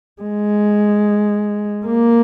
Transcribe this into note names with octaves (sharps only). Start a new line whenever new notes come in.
G#3
A#3